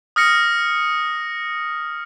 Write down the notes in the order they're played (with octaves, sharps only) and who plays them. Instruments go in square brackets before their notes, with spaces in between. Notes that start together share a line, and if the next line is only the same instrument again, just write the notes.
[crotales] D#6 F6 A#6 C#7